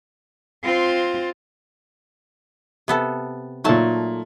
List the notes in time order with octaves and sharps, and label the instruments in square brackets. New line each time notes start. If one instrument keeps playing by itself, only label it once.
[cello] C4 F4
[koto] C3 B3 A4
[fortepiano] A#2 D#4 [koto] F#3 A3 A5